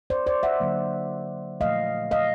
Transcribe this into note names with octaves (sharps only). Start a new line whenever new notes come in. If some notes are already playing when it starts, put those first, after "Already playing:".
C5 D5
C5 D5
E5 F#5
D3 F#3 A#3
A#2 F3 A3 D#5 F5
D#5 F5